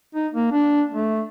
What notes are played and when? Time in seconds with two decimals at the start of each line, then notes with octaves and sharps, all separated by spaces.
0.15 D#4
0.34 A#3
0.52 D4
0.94 A3